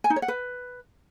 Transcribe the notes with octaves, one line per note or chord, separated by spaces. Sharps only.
G#5
D#4
C#5
F#5
B4